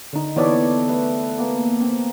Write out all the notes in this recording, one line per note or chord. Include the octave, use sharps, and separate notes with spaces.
D3 D#4
E3 B3 A4 C#5 D5
A3 B4
A#3 B3
C4